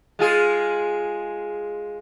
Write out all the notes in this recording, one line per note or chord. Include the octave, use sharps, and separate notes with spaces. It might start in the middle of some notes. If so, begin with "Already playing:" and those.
G#3 F4 G#4